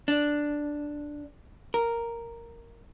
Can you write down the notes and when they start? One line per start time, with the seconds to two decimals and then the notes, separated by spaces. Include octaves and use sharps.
0.08 D4
1.74 A#4